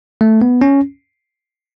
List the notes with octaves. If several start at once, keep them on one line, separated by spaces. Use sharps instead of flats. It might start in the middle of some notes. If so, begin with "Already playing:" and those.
A3
B3
C#4